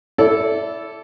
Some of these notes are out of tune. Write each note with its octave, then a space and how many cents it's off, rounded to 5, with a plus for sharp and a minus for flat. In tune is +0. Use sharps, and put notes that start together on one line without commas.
E4 +0 A4 -10 D5 -25